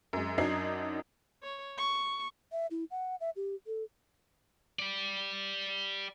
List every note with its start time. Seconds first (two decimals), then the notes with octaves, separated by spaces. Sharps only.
0.13 F#2 G#3
0.38 F#2 F#3 D4 D#4 G#6 C7
1.43 C#5
1.78 C#6
2.52 E5
2.71 E4
2.91 F#5
3.21 E5
3.36 G4
3.67 A4
4.79 G4 D5